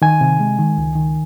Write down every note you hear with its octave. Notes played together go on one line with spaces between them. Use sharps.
D#3 G#5
C3
G#3
D#3
C#2
D#3